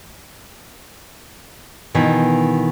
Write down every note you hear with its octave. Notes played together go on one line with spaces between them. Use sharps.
B2 D#3 E3